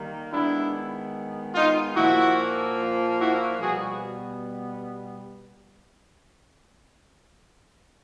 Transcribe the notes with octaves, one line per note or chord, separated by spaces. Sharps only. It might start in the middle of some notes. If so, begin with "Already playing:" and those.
Already playing: D#3 G3 A#3
D#3 G#3 B3 D4 E4
D#4 F4
A#2 F3 A#3 E4 F#4
E4 F#4
B2 G3 B3 F#4 G#4